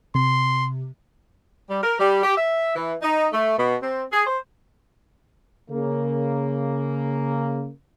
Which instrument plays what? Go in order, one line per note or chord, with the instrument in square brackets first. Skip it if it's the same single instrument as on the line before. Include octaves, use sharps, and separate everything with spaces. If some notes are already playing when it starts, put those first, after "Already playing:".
[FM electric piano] C3 [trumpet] C6
[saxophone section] G3
A#4
G3
G4
E5
E3
D#4
A3
B2
C4
G#4
C5
[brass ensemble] C#3 A#3